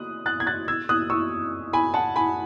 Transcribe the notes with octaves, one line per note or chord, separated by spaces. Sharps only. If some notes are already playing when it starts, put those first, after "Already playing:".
Already playing: D#6 F#6
F#6 A6
G#6
F#6 A6
E6 G#6
D#6 F#6
C#6 E6
G#5 B5
F#5 A5
G#5 B5